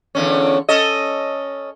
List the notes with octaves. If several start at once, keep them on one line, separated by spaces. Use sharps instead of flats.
E2 D3 C#4
C#4 A4 D#5